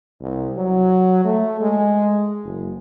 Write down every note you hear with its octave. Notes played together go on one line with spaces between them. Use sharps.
C2
F#3
A3
G#3
F#1